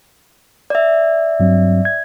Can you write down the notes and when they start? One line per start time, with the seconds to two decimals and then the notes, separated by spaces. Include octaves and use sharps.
0.70 D5 E5
1.40 G2 F#3 C4
1.85 G#6